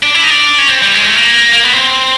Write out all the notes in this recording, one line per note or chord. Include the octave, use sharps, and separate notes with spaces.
D4
E4
D#4
D4
C#4
C4
G3
G#3
A3
A#3
A#3
B3
C4